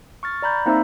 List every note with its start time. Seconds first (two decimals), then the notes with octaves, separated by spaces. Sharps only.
0.23 C#6 F6 A6
0.42 D5 A#5 B5 G6
0.66 A#3 C4 D#4 C5 E5 E6